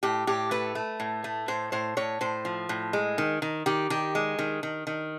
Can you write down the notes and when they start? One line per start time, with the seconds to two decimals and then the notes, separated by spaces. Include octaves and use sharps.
0.03 A2 G4
0.27 A2 G4
0.51 A3 B4
0.75 A3
1.00 A2
1.24 A3
1.48 A2 C5
1.72 A2 C5
1.97 A2 C#5
2.21 A2 C5
2.45 F3
2.69 A2
2.93 G#3
3.18 D#3
3.42 D#3
3.66 D#3 G4
3.90 D#3 G4
4.15 G#3
4.39 D#3
4.63 D#3
4.87 D#3